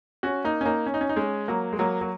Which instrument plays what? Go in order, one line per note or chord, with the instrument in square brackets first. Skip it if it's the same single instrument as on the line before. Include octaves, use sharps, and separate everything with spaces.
[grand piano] C#4 F#4
A#3 D#4
C#4
A#3 D#4
C#4
D#4
C#4
D#4
G#3 C#4
F#3 A#3
G#3
F#3 A#3
F#3